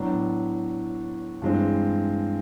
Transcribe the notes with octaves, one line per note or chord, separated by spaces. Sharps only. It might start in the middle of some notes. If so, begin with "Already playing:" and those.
Already playing: A2 F#3 B3 D4
G2 E3 G#3 C4